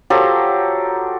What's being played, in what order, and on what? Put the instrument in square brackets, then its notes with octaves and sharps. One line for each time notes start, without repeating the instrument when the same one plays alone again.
[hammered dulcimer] F3 F#3 G4 A4